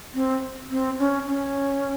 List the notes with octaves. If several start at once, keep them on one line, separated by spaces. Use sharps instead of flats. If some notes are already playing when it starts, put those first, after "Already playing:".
C4
C4
C#4
C#4